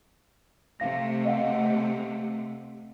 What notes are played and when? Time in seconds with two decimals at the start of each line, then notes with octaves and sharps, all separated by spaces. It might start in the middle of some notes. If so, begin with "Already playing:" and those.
0.80 C3 A3 F5 A#6
1.25 D#5 F5 F#5